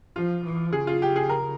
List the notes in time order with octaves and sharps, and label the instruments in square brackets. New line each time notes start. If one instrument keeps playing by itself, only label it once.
[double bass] F3 [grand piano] F4
[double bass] F3
[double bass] C#3 [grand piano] G#4
[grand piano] F4
G4
G#4
A#4